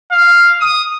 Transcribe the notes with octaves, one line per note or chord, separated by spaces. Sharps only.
F5
D#6